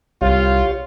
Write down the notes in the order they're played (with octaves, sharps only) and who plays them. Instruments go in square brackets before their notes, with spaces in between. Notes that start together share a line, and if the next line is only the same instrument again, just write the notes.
[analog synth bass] C2 [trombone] F4 [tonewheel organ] G4 C#5 F5